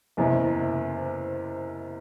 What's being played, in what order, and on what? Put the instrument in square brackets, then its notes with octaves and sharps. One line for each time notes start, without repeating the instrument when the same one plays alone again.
[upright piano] F#1 E2 C3